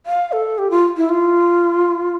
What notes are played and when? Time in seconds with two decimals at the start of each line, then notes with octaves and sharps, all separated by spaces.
0.06 F5
0.32 A4
0.58 G4
0.71 F4
0.97 E4
1.09 F4